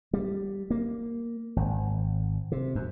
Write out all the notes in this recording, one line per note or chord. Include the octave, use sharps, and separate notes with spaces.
G3
A#3
G#1
C3
F#2